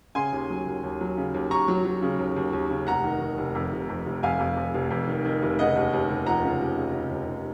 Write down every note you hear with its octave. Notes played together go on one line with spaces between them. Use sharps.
C#3 G#5 C6
D#2
F#3
D#2
D#2
F#3
C#3
D#2
D#2 A#5 C#6
F#3
F#3
C#3
D#2
D#2
D#2
C#3
F1 F#5 A#5
D#3
D#3
F1
F2
F1
F2
F1
F2 F5 G#5
F2
F2
F1
F2
D#3
D#3
F1
C#3 D#5 F#5
D#2
D#2
D#2
F3 F#5 A#5
C#3
D#2
C#3
C#3
D#2
D#2